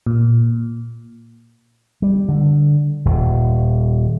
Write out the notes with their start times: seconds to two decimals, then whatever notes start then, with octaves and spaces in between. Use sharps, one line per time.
0.06 A#2
2.02 G3
2.28 D3
3.05 D#1